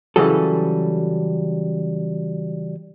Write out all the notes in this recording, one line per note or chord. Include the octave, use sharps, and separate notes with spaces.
C#3 E3 F#3 G3 G#4 A4